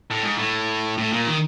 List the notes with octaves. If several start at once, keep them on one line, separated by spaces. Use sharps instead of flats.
A2
G#2
A2
A2
A#2
D#3